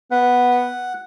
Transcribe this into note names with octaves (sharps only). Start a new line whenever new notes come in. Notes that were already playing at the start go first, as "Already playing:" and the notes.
B3 F#5